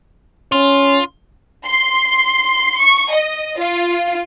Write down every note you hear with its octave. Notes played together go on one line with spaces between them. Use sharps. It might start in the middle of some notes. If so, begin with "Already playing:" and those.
C#4 F4
C6
C#6
D#5
F4